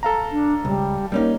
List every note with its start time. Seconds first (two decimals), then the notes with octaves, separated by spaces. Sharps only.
0.03 A4 F5 A#5
0.32 D4
0.65 C#2 G3
1.12 G3 A#3 C#4 D#4